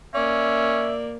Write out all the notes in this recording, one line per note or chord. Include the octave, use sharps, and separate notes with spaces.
A#3 C#4 D5 E5